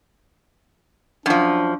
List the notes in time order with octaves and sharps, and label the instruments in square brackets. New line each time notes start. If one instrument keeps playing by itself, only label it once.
[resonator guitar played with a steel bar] F#2 F3 [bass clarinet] D4